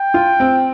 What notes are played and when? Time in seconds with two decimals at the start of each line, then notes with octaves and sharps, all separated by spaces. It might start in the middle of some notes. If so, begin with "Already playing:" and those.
Already playing: G5
0.14 F4
0.40 C4